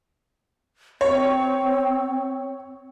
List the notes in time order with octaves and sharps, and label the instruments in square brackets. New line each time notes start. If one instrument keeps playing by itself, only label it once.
[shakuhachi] C4 [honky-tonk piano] C#5